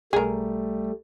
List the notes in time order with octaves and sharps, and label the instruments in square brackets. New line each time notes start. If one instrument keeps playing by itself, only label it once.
[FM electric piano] B1 [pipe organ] G3 A3 [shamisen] G#4 A#4